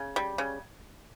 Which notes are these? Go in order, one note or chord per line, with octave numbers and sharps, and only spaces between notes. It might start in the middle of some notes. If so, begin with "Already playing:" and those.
Already playing: C#3
G3
C#3